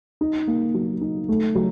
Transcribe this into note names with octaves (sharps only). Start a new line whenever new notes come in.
D#4
A#3
F#3
D#4
A3
F#3